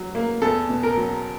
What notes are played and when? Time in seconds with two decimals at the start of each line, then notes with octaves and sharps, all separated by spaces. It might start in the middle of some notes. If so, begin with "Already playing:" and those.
Already playing: F#3
0.15 A#3
0.42 E2 A4
0.69 B2
0.83 A#4
0.97 F#3